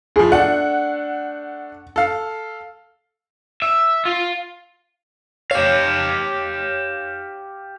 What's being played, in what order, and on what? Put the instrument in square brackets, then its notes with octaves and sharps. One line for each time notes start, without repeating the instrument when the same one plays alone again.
[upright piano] A2 F3 [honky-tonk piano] G#4
[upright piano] A3 D4 [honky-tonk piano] F#5
[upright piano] A4 F5
[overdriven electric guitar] E5
F4
[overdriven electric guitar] G4 F5 [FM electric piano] C#5 F6